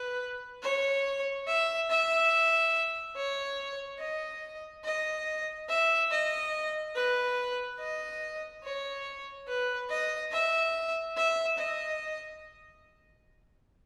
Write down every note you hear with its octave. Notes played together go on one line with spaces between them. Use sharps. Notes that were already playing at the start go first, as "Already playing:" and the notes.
Already playing: B4
C#5
E5
E5
C#5
D#5
D#5
E5
D#5
B4
D#5
C#5
B4
D#5
E5
E5
D#5